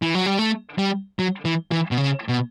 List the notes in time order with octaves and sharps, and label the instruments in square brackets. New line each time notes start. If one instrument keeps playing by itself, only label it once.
[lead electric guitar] E3
F#3
G3
A3
G3
F#3
E3
E3
B2
C#3
B2